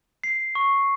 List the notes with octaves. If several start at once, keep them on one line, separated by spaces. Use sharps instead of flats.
C7
C#6